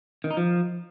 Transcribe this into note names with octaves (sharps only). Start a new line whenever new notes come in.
D#3
D#4
F3